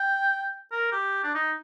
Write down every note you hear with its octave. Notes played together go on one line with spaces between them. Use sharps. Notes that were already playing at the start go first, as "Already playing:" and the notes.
Already playing: G5
A#4
G4
D4
D#4